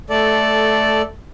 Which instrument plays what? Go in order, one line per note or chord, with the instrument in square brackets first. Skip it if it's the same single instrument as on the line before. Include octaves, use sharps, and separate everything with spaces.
[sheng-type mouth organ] A3 A4 D5